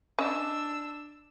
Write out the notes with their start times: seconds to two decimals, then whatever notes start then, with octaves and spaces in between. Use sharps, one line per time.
0.19 C#4 D4 D#5 E6